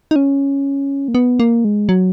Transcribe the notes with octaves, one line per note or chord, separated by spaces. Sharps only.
D#4
C#4
A#3
B3
A#3
G#3
F#3